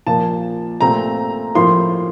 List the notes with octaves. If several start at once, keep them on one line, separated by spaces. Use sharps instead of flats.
A#2 F3 A#3 A5
A#2 A3 C4 A#5
A2 F3 A#3 C6